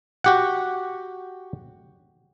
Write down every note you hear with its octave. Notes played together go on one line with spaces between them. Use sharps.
F#4 G4 F#5